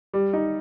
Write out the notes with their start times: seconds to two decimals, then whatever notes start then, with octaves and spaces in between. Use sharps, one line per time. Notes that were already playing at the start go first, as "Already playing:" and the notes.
0.14 G3
0.33 D#4